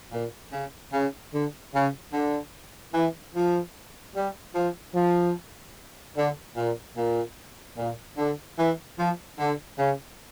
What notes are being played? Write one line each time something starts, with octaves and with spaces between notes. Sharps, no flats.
A#2
C#3
C#3
D3
C#3
D3
E3
F3
G3
F3
F3
D3
A#2
A#2
A#2
D3
E3
F3
D3
C#3